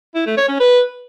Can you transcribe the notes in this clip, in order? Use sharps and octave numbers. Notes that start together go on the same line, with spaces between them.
E4
A3
C#5
C#4
B4